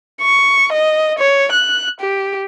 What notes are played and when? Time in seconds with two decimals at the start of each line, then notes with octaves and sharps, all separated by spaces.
0.22 C#6
0.72 D#5
1.19 C#5
1.52 F#6
2.01 G4